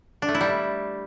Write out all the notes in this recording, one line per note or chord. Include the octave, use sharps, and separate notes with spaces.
D4
A3
E4
G3